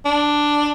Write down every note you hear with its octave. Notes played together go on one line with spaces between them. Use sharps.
D4